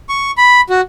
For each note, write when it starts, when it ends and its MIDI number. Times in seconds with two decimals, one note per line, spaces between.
0.09 0.31 85
0.38 0.61 83
0.69 0.81 66